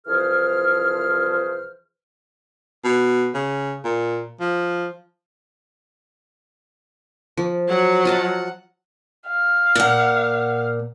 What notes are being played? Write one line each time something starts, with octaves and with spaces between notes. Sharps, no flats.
C2 E3 F3 G#4 C5 F6
B2
C#3
A#2
F3
F3
F#3 F#5
F4 D#5 A5
F5
A#2 F#5